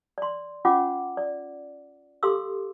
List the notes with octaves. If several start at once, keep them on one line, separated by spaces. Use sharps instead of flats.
D5 C6
C#4 F4 F#5 D6
D5
G4 A4 F5 C6 D6 E6